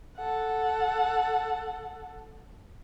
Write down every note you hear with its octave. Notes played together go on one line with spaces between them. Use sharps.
A4 F#5